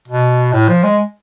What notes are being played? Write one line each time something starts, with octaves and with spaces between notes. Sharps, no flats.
B2
A2
F3
G#3